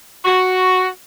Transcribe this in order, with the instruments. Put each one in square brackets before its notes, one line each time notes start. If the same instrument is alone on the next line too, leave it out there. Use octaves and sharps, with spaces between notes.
[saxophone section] F#4